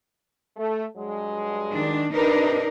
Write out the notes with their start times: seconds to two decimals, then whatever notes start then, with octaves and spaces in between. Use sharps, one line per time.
0.56 A3
0.96 G2 F#3 G#3
1.72 D#3 D4
2.14 C3 D4 D#4 A#4 B4